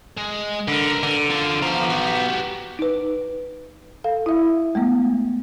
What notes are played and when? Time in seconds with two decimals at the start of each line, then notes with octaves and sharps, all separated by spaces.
0.17 G#3
0.68 D3 A#4 B4
1.03 D3
1.31 F4 A4
1.62 F3 B3 C5 A#5
1.90 F#4 G4
2.79 D#4 B4
4.04 A4 F5
4.26 E4 E5
4.75 G#3 A3 B3